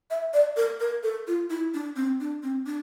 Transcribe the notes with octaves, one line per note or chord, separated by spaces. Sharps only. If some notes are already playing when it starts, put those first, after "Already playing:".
E5
D5
A#4
A#4
A4
F4
E4
D4
C4
D4
C4
D4